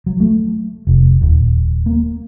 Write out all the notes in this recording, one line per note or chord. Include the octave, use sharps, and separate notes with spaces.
F#3
A3
F1
D#1
A#3